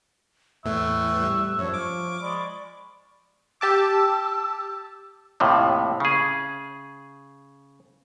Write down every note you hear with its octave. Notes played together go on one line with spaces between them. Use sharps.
E2 A2 E3 A3 E5 C#6 F#6
G3
F#2 F3 D4 C#5 C#6
C#6 D6 F6
G#3 D5 B5 C#6
G4 A5 D6 E6
D#2 A2 C3 F3
C#3 G#4